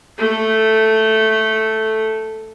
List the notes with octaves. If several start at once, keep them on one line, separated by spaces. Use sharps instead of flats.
A3 A4